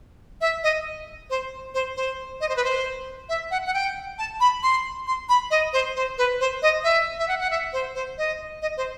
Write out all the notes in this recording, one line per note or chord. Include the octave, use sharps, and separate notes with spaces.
E5
D#5
C5
C5
C5
D#5
C5
B4
C5
E5
F#5
F#5
G5
A5
B5
C6
C6
B5
D#5
C5
C5
B4
C5
D#5
E5
E5
F#5
F#5
E5
C5
C5
D#5
D#5
C5